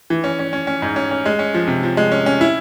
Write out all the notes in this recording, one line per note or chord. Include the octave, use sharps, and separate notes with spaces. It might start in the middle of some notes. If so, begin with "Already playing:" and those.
E3
C#4
C#4
C#4
C#4
G#2
C#4
C#4
G#3
C#4
F3
C3
F3
G#3
C#4
C#4
E4